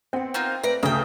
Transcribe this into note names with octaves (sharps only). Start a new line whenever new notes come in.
B3 C4 F#5
A#3 D#4 F4
A3 B4 D5 A#5
D2 C#3 D4 A4 E5 G5 A#5 D#6